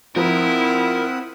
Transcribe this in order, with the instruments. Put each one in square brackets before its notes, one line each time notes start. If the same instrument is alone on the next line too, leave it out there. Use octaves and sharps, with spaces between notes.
[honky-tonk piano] F3 [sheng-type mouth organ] C4 F#5 D#6 [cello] E4 [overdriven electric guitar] A#4